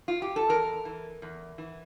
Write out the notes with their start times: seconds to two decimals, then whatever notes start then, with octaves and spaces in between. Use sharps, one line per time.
0.08 F4
0.22 G4
0.36 A4
0.49 E2 A#4
0.85 E3
1.22 E2
1.58 E3